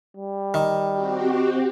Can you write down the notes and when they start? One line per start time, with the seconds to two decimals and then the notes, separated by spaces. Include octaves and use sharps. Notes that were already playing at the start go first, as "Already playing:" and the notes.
0.17 G3
0.54 D#3
0.92 C4 F#4 G4